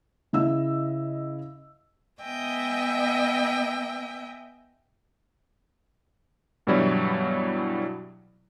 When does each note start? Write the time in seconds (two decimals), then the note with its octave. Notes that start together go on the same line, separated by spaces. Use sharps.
0.33 C#3 E4 D#5 E5 E6
2.21 B3 D#5 E5 G5 G#5
6.67 G2 B2 E3 F#3 G3 E4